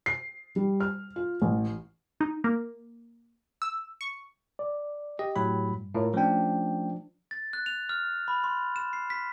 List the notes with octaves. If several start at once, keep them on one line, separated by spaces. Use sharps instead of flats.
C7
G3
F6
F4
A1
D#4
A#3
E6
C#6
D5
G4 D#5
A2 F#3 B5
G2
A2 F4 A#4 C#5
F3 A3 C#4 D4 G5
A6
F#6
F7
F6
B5
C6
E7
C7
B6